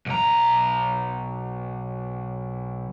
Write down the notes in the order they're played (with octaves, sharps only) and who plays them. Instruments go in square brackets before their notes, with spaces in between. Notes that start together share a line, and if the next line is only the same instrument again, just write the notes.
[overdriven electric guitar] B1 A#5